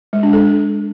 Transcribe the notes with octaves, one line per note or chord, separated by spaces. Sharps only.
G#3
D4
A4